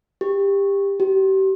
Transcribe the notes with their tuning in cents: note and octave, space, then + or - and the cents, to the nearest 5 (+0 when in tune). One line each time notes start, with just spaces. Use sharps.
G4 +20
G4 -35